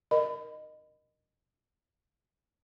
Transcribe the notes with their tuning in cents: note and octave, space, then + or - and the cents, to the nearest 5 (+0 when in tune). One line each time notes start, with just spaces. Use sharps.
A#4 +5 D#5 -20 B5 +25